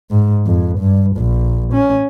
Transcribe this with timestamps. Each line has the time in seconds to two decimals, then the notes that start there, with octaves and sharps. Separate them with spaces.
0.11 G#2
0.46 F2
0.79 G2
1.17 A#1
1.73 C#4